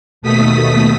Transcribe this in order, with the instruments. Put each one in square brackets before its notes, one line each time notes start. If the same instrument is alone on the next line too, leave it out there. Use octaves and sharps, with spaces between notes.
[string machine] D#2 B2 A3 D#6 B6